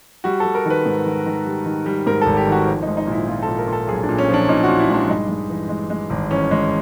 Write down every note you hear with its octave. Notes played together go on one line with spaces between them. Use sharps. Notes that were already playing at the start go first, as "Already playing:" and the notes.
G3 F#4
G3 A4
A#4
D#3 B4
G#2
D#3
D#3
G3
D#3
G3
G#2 A#4
G#1 A4
G4
D#3 F#4
F3
G#3 D#4
D#4
A#2 E4
G#3 F4
A4
A#2
A#4
A#2
A4
B1 G#4
D4
A#2
C#4
F3 D4
A#2 D#4
A#2 F#4
E4
G#3 D4
G2 D#4
G#3
E3
G#3
G#3
G#1
E3 C#4
G#3